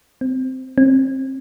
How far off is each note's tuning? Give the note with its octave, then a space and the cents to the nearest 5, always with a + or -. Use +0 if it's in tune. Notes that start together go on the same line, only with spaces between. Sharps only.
C4 -15
C4 +25